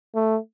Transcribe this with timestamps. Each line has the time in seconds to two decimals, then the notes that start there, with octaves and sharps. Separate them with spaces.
0.15 A3